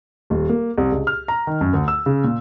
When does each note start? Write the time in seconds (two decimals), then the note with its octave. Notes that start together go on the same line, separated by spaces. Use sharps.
0.30 D#1
0.49 A#3
0.78 C2
0.92 C#2
1.07 F6
1.28 A#5
1.47 D#3
1.61 F#2
1.73 D2
1.88 E6
2.06 C#3
2.24 A#2